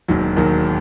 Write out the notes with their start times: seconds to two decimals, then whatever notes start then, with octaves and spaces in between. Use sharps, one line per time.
0.08 E1 D#2 D#3 F#3
0.36 E1 D#2 D#3 F#3